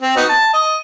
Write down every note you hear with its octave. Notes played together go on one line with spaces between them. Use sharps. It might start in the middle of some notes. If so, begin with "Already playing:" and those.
C4
B3 D#4 F#4
A5
D#5